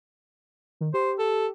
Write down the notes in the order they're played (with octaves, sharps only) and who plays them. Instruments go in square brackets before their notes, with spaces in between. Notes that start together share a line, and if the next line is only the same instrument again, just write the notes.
[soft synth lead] D#3
[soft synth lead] G4 [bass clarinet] C5
[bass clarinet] A4